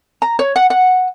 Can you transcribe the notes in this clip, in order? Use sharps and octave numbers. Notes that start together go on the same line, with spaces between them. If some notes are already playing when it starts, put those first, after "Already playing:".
A#5
C#5
F#5
F#5